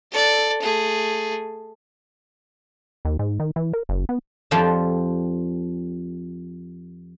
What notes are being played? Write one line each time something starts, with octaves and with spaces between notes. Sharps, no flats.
A4 D5
A3 G#4
D#2
G#2
D#3
E3
A#4
F#1
B3
F2 F3 G3 F5 G5 A5